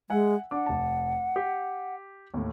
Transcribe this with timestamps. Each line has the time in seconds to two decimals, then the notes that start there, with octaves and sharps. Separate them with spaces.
0.10 G#3 E5 F#5 G#5
0.51 D4 F#5 D6
0.66 F1 A5
1.36 G4
2.34 D#2 A2